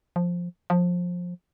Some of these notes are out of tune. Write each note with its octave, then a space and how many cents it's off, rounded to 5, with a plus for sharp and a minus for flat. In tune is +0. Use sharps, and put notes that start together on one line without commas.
F3 +5
F3 +20